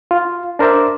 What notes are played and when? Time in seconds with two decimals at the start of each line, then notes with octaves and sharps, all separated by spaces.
0.11 F4
0.59 D4 A#4 C5 D5 E5